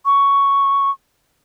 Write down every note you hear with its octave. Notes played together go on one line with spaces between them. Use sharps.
C#6